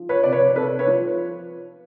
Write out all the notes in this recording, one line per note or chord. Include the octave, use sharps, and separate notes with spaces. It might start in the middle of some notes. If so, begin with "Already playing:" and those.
Already playing: F3
B4 C#5
C3 D5
B4 C#5
C3 A4 B4
B4 C#5
F3